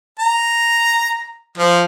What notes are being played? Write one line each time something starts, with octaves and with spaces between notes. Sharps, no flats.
A#5
F3